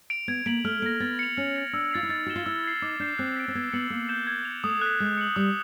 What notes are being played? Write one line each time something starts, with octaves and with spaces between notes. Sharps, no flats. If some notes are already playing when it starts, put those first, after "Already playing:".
D7 F7
B3 G#6
A#3 B6 D7 F#7
A3 F6
A#3 A#6 D7
B3 A6
C#7 F7
C#4 F6
A6 C#7 F#7
D4 E6
F4 A6 C7 F7
E4
D#4 A6
F#4 C#7 E7 G7
F4
E4 E6
G#6 C7
D#4 D6
D4 G6 C7
C4 F#6
B6 D7
C4
B3 G#6
B3 C#7 F#7
A#3 E6
G6 C7 E7 G7
G#6
F7
C#7
A3 D#6
F#6 B6
G#3 G#6
C#7 F#7
G3 D#6